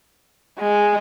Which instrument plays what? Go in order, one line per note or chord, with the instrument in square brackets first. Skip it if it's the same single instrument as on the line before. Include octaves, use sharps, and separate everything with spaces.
[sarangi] G#3